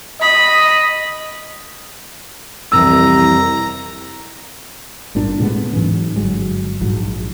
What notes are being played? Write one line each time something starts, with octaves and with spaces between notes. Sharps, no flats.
D#5 B5
C2 F2 C3 E3 A#5 E6
G#1 G2 A#2 D4
A2 C3 G#3 B3
G#2 E3 F#3 C#4
G1 F#3 G#3
A#1 G#2 F#3